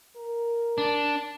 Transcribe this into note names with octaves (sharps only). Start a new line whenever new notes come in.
A#4
D4